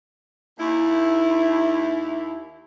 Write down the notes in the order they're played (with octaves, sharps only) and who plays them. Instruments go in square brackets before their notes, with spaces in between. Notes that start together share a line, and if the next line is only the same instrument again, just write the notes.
[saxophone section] D#2 E4